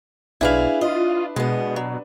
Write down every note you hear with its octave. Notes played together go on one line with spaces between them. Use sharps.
B1 D4 E4 G#4 B4 F5 F7
F4 D#5
B2 G#3 B3
F#3